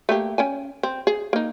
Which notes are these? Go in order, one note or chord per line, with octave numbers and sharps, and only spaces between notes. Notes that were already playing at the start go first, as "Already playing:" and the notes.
A3 A#3 G4
C#4 G5 G#5
C4
G#4
A#3 D#4